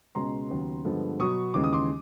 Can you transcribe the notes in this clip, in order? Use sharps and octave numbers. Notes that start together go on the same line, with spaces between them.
C#2 B2 G#3 C#4 A#5 C6
D#2 C#3 F#3 B3
G2 D3 F3 G#3 B3
B2 F#3 B3 C#6 D#6
D#2 C#3 E3 G#3 D6
D#6
C6 D6